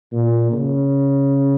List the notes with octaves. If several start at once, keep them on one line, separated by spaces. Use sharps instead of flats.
A#2
C#3